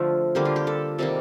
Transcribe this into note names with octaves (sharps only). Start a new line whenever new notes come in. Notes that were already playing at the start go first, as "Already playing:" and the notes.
Already playing: D3 F3 A3 F4
D3 G3 A#3 G4
F4
G4
A4
C3 D#3 G3 A#3 A4